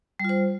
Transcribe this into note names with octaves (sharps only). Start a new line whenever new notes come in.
G3 F4 C5